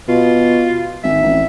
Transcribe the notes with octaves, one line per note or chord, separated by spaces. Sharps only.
B2 F4
G#1 E5
A1